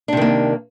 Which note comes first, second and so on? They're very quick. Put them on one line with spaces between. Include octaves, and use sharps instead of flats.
D4 C3 D#3 A#3